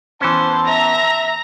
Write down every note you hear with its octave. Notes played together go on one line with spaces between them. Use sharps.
E3 B3 C#4 C5 A5
E5 A#5